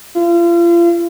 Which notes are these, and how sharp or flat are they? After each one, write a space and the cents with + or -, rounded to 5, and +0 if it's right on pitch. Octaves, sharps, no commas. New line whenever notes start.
F4 -35